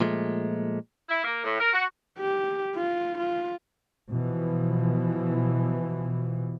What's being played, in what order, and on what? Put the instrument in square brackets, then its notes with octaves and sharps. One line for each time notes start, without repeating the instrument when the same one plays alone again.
[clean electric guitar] A#2 F3 G#3 A3
[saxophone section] E4
A#3
A2
A#4
F#4
[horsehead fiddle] G4
F4
F4
[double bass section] B2 E3 F3